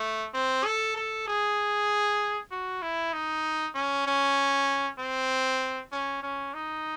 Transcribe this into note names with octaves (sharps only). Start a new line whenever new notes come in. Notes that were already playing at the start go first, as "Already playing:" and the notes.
Already playing: A3
C4
A4
A4
G#4
F#4
E4
D#4
C#4
C#4
C4
C#4
C#4
D#4